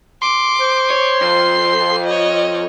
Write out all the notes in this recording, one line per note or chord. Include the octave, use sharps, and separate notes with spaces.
C6 D6
C5
C#5
F2 C7
C#5 D#5